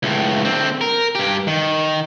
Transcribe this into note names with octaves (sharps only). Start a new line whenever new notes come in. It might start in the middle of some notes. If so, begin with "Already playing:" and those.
C#2 A2
D3 C4
A#4
G2 G4
D#3